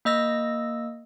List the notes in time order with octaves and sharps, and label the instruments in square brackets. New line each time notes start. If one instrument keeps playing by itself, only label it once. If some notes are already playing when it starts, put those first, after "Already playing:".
[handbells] A#3 D#5 E6 A#6